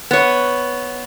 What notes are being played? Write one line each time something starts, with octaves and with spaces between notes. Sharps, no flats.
B3 C#5